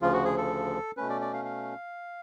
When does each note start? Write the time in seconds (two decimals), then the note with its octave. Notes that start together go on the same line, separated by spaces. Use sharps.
0.02 D2 C#3 F3 F4
0.13 F#4
0.25 G#4
0.38 A4
0.97 B2 A3 C#4 B4
1.09 D5
1.21 D5
1.34 F5
1.45 F5